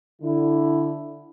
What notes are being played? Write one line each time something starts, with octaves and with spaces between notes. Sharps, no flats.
D3 E4